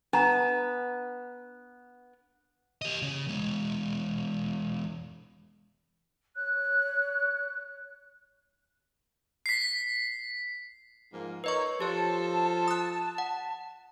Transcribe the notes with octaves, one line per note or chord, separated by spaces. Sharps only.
B3 D4 A#5
G4 D#5
C#3 C#4
E2 G#3
C#5 F#6
B6 C7
G#2 F3 A#3
D#4 A#4 B4 C#5 D#5 C#6
F3 G4 A4 C#5 A5
D#6 F#6
F#5